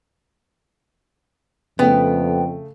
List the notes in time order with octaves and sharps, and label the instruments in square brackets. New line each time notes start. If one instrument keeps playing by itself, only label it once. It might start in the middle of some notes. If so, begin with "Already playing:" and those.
[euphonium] F2 [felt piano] C#3 A3 [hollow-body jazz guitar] B3 [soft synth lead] G5